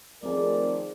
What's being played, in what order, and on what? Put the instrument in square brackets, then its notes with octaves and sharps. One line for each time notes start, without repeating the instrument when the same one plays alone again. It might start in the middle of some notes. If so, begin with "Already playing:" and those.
[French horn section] D#3 F3 [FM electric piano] A3 C4 G#4 [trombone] A#4 [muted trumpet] D5